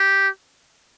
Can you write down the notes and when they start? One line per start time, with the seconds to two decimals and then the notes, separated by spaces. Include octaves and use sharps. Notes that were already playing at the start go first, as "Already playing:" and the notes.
Already playing: G4